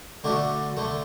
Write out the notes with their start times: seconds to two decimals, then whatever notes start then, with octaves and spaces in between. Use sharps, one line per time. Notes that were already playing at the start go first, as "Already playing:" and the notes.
0.24 D3 A3 D4 F#4
0.77 D3 A3